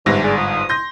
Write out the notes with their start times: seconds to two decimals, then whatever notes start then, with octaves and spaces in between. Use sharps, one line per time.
0.06 G1 G#2 C3 E3 A#6
0.23 G#4 D5
0.36 F3 D#6
0.69 C6 G6 A#6